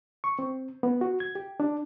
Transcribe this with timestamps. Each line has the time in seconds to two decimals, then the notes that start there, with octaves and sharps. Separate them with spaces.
0.24 C#6
0.39 C4
0.83 B3
1.01 F#4
1.20 G#6
1.35 G4
1.60 D4